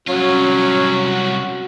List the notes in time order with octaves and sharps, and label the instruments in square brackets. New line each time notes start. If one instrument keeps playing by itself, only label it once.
[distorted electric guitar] C2 F4 [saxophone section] F#3 C#4 [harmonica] F#4 [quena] C#5